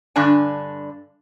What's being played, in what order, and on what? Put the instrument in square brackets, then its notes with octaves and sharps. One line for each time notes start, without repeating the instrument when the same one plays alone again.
[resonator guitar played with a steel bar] G2 D3 D4 G#5